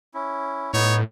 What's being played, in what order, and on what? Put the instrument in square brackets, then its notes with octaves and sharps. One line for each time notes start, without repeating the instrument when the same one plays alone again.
[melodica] C#4 E4
[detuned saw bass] A2 [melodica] B3 D#4 [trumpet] C#5